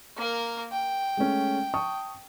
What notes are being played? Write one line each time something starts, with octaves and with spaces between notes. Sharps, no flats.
A#3 A#4
G5
G#3 A3 C#4
A5 C#6 D#6